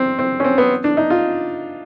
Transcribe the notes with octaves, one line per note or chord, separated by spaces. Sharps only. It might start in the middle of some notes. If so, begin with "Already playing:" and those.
Already playing: C4
C4
C#4
C4
B3
D4
D#4
F4